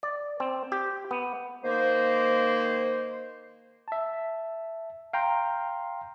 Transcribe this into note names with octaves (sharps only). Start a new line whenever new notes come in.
D5
C4
G4
B3
D#3 A#3 C5
E5 A5
F5 G5 A#5 C6